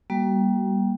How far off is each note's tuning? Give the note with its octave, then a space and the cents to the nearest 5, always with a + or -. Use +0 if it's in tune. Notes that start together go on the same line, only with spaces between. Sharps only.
G3 +0 A#3 +35 F#4 +30